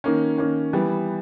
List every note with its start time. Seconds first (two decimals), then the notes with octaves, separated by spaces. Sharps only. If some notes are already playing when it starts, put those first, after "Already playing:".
0.04 D#3 A#3 C#4
0.38 D#3 A#3 C#4
0.73 E3 G3 B3